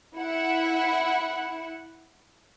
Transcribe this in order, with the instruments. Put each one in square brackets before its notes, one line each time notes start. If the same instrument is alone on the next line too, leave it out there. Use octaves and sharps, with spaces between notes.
[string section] E4 F#5